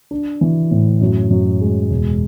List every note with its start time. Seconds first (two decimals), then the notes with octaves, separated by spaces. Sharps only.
0.11 D4
0.41 E3
0.71 A2
1.01 F#2
1.30 F#2
1.61 G#3
1.90 E1